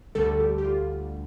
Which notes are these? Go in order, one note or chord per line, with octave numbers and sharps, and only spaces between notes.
D2 D3 G3 A4
G4
G4
F4